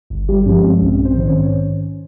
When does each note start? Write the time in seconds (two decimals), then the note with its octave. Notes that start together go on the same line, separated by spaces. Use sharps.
0.10 G1
0.29 G3 G4
0.46 G2 F3 G#3 C#4
0.64 C4
0.81 A#1 C#4
1.05 C4 C5
1.16 G#2 D#3 C5
1.28 C#4 C#5